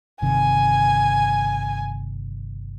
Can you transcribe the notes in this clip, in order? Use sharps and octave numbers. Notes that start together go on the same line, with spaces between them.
G1 C3 D#3 G#5